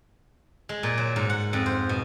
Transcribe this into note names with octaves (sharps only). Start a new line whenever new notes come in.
G#3
A#2
F#3
G#2
F#5
F2
C5
B2